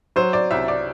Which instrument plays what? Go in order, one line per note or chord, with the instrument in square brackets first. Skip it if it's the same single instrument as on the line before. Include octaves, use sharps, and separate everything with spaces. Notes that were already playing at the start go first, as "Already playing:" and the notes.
[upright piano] F#3 C5
D5
C2 E5
D5